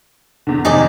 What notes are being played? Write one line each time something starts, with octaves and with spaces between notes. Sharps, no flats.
E2 D3
F2 C3 D#3 D#4 G#4 D5